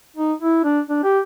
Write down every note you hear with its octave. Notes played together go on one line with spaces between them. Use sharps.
D#4
E4
D4
D4
G4